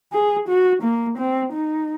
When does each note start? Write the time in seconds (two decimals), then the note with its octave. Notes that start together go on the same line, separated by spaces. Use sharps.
0.13 G#4
0.48 F#4
0.83 A#3
1.18 C4
1.53 D#4